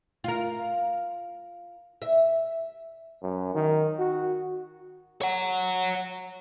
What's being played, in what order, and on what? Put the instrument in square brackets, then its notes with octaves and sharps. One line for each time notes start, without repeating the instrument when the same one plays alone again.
[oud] F4 A#4
E5
[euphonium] F#2
D#3
F#4
[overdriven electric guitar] C#5 F#5